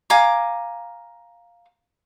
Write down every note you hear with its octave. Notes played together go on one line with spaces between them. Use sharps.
F5 G#5 A#5 D6